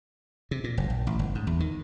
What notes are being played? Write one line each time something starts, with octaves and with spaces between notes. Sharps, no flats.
C3
A#2
F#1
A#1
A1
G1
G#2
E2
D#3